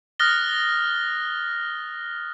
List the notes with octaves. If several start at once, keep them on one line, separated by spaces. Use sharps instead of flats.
D#6 F6 F#6 A6 A#6 G7